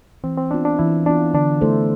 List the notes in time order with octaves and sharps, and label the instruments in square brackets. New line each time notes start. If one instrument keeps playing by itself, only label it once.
[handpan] E3 [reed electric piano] C4
[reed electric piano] C4
[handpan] B3 F4 [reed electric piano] D4
[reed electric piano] D4
[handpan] E3 [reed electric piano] E4
[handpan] B3 F4 [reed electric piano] D4
[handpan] D3 [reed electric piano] D4
[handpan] A3 E4 A4 C5